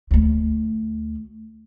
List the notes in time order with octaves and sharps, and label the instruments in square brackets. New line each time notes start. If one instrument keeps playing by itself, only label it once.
[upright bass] D2 A3